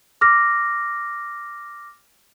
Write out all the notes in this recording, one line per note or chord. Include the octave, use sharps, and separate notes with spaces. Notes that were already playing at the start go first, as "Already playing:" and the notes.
D6 F6 A#6